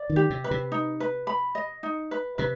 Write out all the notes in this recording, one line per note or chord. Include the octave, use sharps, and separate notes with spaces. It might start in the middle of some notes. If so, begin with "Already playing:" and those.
Already playing: D5
D#3
G4
C3
B4
C3
D#4
B4
B5
D#5
D#4
B4
C3 B4